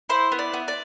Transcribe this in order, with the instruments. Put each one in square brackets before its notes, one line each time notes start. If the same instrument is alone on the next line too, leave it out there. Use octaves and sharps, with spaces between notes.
[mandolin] E4 C5
B3
D5
B3
D5